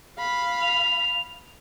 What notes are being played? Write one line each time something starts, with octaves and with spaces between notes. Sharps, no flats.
F5 B5
F7